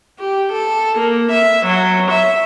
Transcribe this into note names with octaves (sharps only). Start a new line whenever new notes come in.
G4
A4
A#3
E5
F#3
E5